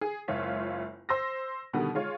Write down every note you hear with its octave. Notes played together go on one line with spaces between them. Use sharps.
G#4
F#1 C#2 F4 C#5 E5
C5 E6 A#6
B2 D3 D#3 G3 B3
G#3 F4 C#5